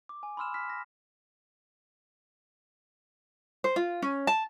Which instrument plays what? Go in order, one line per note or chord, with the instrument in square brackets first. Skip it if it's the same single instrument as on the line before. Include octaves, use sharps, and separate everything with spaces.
[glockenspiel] D6
G#5
B5 C6 E6 F6 E7
F6 B6
A#6
[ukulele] C5
F4
C#4
A5